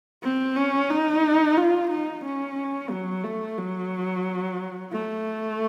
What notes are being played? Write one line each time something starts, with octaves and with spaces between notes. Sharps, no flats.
C4
C#4
D#4
F4
D#4
C#4
F#3
A3
F#3
A3